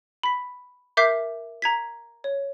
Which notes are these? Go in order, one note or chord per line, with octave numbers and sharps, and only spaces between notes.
B5 B6
A#4 E5 D6 G6 B6 C7
A#5 G#6 B6
C#5